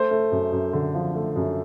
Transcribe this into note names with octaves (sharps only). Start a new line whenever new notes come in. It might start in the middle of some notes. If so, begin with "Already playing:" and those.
Already playing: A3 C5
A3
F#2
F#2
D3
F3
A3
F#2